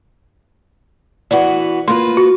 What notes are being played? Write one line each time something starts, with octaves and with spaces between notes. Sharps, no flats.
E3 B3 F#4 D5 F#5
A#3 F4 B4 C6
F#4